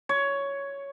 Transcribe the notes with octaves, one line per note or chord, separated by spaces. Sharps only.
C#5